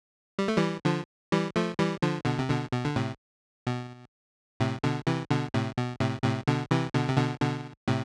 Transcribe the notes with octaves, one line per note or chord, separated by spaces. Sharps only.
G3
A3
E3 G3
D3 F3
E3 G3
F3 A3
E3 G3
D3 F3
B2 D3
C3
B2 D3
B2
D3
A2 C3
B2
A2 C3
B2 D3
C3 E3
B2 D3
A2 C3
B2
A2 C3
A2 C3
B2 D3
C3 E3
B2 D3
C3
B2 D3
B2 D3
A2 C3